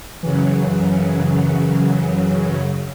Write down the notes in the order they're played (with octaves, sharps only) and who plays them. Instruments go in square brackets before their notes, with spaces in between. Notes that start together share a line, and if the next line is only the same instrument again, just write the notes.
[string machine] F#2 C#3 F#3 [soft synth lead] E3